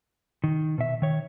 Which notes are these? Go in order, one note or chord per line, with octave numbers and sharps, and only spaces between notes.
D#3
B2 E5
D#3 C#5